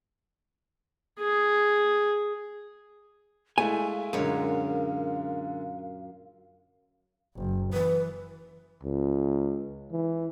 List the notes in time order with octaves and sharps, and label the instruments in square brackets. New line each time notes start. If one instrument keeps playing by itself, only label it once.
[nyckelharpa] G#4
[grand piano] G#3 A3 E4 [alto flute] F5 [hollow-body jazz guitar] G#5
[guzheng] F#2 A#2 C#5 [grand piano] D3 G#3
[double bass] F#1
[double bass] E3 [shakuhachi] B4
[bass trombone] C#2
E3